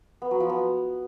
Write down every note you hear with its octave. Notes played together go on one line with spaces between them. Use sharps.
B3
F#3
F3
B3